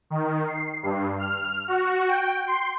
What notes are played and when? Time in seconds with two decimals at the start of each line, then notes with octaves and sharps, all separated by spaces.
0.10 D#3
0.48 C7
0.83 G2
1.19 F6
1.68 F#4
2.08 G5
2.47 C6